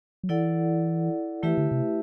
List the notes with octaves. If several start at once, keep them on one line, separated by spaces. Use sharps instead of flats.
F#3
E3 E4 A4 D5 F#5
E3 A3 E4 G4 B4 E5
D3
C3